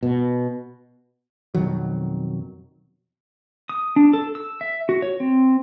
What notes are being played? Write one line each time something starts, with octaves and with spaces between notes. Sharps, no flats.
B2
F2 B2 D#3 F#3
D#6
D4
A4
E6
E5
F#4
C#5
C4